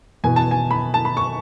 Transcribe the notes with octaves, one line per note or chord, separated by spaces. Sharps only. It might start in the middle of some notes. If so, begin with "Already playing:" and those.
E2 B2 G#5
A5
G#5
B5
A5
B5
C#6